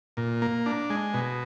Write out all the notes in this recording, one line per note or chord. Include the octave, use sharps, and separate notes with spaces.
A#2
A#3
D4
G#3
B2